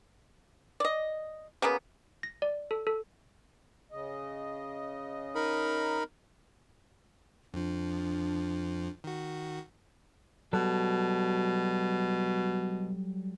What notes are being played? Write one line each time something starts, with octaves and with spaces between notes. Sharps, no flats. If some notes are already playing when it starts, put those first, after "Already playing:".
D5 D#5
C#3 F#3 A#3 B3
A#6
D5
A4
A4
C#3 D#5
D#4 A#4 B5
F2 F3 D4
D#3 F#4
B2 F#3 G3 A4